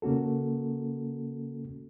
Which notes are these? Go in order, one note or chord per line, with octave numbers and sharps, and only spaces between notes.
C#3 A#3 C#4 F#4 A4